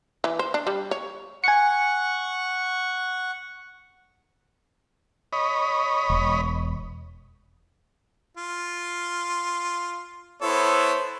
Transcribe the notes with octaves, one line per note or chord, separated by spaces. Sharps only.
E3
C5
D4
G3
C#5
F#5 G#5 C#6 C#7
C#5 D#5 B5
E1
F4
B3 E4 A4 C5 C#5